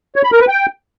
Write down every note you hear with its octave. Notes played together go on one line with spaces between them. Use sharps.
C#5
B5
A#4
B4
G5